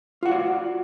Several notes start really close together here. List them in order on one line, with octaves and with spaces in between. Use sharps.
F4 F#5 F#4 D5